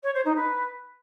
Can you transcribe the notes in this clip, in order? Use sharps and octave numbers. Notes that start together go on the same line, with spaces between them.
C#5
C5
D#4
B4